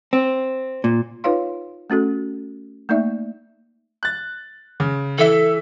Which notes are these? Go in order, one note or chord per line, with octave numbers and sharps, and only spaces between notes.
C4
A#2
D#4 F4 B4 C#5 F5 C6
A3 C#4 F#4 A4
A3 A#3 D#4 D5 E5
F#6 A6
C#3
E3 A4 E5